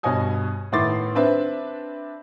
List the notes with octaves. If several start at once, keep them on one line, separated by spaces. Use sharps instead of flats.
G2 B2 C#5 D#5 G#5 D#6
A2 D#3 B3 C6 D6 A6
C4 D4 B4 E5